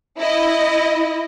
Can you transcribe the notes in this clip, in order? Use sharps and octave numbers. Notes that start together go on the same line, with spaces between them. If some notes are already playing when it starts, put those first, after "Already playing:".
E4 D#5